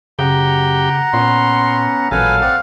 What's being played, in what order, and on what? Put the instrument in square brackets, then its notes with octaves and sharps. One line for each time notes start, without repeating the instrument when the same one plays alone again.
[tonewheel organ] F#2 G4 G5 [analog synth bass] C#3 [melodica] F#5 A#5
[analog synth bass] A#2 [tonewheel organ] B3 C#4 [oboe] C6
[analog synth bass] A1 [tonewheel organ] A#2 F#3 A4 [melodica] B4 G#5 [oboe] F5
[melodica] C4 D5 F#5